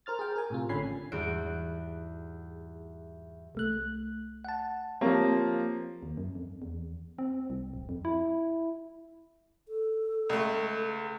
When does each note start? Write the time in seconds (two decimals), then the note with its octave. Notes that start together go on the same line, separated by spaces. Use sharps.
0.06 A#4 C5 F6 A6
0.19 G#4 G5
0.36 A#4 G#5
0.50 A2 C3 F4
0.69 A1 D3 C#4 G#5 B5 C7
1.12 E2 G#2 G3 F#4 D7
3.55 C2 A3 F#6
4.45 F#5 A5
5.01 F3 A#3 C4 G4 C#5
6.03 D#2
6.17 F#2
6.35 F2
6.62 E2
7.18 C4
7.50 C2
7.74 D1
7.89 F2
8.05 E4
9.68 A4
10.29 C#2 A3